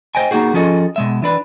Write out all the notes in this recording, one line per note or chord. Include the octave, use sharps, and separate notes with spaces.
C5 D#5 G5 G#5
A#3 C#4 D#4 F#4 G#4
F3 C#4 F4 G#4 A4 D#5
B2 G#3 E5
E3 D4 B4